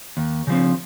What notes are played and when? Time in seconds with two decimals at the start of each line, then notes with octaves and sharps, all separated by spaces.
0.17 D#2
0.47 C#3 F3 C4